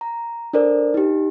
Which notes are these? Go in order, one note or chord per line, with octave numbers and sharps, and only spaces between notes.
A#5
D4 A4 A#4 C5 D5
D#4 G4